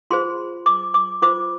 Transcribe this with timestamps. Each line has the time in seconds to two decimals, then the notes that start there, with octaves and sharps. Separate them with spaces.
0.10 F4 G#4 C5 C6
0.66 D6
0.94 D6
1.22 F4 C5 D6